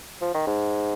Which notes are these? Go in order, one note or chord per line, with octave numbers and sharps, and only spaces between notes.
F3
D#3
G#2